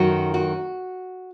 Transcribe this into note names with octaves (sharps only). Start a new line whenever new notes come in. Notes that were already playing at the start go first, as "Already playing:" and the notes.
Already playing: F#2 D#3 A3 F#4
F#4